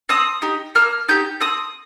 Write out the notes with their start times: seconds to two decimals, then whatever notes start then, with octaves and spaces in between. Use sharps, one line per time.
0.09 C4 D#6
0.42 D#4 G4
0.75 A#3 F6
1.08 D#4 G4 G6
1.40 C4 D#6